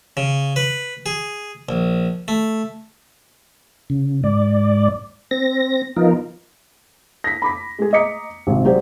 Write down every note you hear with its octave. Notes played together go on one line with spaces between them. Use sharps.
C#3
B4
G#4
A#1
A3
C#3
G#2 D5
C4 A#6
F3 B3 D#4 F4 A#4
A#6 B6
B5 D6 B6
G#3 G#4
D#5 A#5 D6 B6 C#7
G#1 C3
F#3 G#3 G4 C5 D5